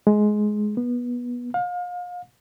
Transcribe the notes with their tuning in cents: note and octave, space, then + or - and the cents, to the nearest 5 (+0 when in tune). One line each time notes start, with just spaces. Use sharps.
G#3 +15
B3 -20
F5 +35